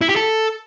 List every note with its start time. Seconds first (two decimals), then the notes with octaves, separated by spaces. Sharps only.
0.01 E4
0.09 G4
0.16 A4